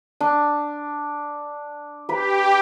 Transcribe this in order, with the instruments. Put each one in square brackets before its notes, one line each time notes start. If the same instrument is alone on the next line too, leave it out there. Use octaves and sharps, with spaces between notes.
[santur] D4
[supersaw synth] G4 [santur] B4 B5